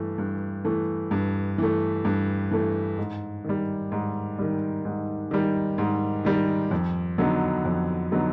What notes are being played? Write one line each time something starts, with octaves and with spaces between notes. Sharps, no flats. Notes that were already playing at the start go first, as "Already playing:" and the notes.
Already playing: G2 E3 A3
G2
E3 A3
G2
E3 A3
G2
E3 A3
G#2
D#3 G3
G#2
D#3 G3
G#2
D#3 G3
G#2
D#3 G3
F2
D3 F#3 B3 D#4
F2
D3 F#3 B3 D#4